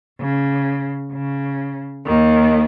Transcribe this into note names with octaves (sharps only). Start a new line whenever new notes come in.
C#3
C#3
D#2 D#3